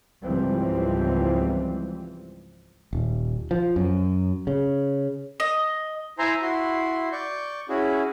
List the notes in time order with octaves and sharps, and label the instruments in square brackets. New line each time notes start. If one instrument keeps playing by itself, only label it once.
[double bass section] C#2 G#2 E3 F3 G3 C4
[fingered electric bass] D#1
F3
F#2
C#3
[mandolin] D#5
[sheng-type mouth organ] E4 C5 E5 G#5 A#5 C6
E4 F#4 C6
D5 C#6 G6
C#4 E4 F#4 G#4